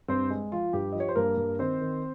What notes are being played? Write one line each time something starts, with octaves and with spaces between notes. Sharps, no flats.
G2 C4 C5
G#3
F3 F4
G2 G4
F3 D#5
C#5
C5
G2 A#3 A#4
G2
D#3 C4 C5
D#3